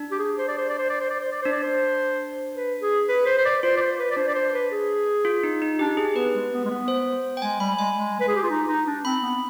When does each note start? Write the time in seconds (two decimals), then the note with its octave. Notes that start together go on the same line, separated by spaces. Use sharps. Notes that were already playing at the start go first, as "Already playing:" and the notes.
Already playing: D4
0.11 G4
0.19 G#4
0.38 C5
0.48 D5
0.58 C5
0.69 D5
0.79 C5
0.89 D5
1.00 C5
1.10 D5
1.21 C5
1.31 D5
1.42 D4 C5
1.52 D5
1.63 C5
2.55 B4
2.81 G#4
3.09 B4
3.26 C5
3.38 C5
3.45 D5
3.63 F4 C5
3.77 D5
3.81 C5
3.99 B4
4.11 D5
4.17 D4 C5
4.28 D5
4.35 C5
4.54 B4
4.71 G#4
5.25 F4
5.43 D#4
5.62 D#4
5.79 D4 G4
5.97 G#4
6.15 B3 B4
6.34 G#3
6.52 B3
6.65 G#3
6.70 B3
6.88 C5
7.37 G5
7.42 G#3 G#5
7.60 G3 B5
7.78 G#3 G#5
7.96 G#3
8.20 B4
8.28 G#4
8.36 G4
8.43 F4
8.50 D#4
8.69 D#4
8.87 D4
9.05 C4 B5
9.23 B3